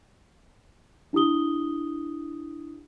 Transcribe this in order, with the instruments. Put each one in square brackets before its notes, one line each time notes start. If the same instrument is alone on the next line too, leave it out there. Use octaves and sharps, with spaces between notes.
[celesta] D4 E4 G4 D#6 G7